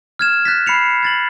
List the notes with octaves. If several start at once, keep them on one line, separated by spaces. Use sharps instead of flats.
F6 G#6 E7
F#6 A6 B6
B5 C7 C#7 F7
G#6 A6 F#7